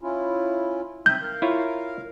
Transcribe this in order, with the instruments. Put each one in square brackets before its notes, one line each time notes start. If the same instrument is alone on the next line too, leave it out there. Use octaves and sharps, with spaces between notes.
[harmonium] C#4 E4 F4
[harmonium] C4 D#4 E5 [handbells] G6
[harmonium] A#4 F5
[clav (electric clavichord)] E4 F4 C#5